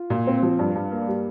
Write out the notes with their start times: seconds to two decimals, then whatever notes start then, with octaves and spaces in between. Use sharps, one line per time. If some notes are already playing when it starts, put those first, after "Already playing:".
Already playing: F4
0.10 A#2
0.27 C4
0.43 F3
0.59 G2
0.76 G2
0.92 A#3
1.08 G3